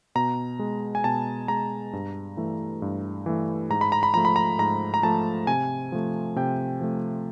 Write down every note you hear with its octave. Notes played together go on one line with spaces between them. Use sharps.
B2 A#5
G#3
G#5
B2 A5
G#3 A#5
G2
E3 A3
G2
E3 A3
G#2 A#5
B5
A#5
B5
F3 A3 A#5
B5
A#5
G#2 A#5
A#5
F3 A3 A5
C3 G#5
F3 A3
C3 G5
F3 A3